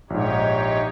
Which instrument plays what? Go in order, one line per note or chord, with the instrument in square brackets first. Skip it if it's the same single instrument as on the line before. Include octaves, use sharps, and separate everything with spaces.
[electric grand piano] A#1 G#2 [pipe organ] D#4 G4 C#5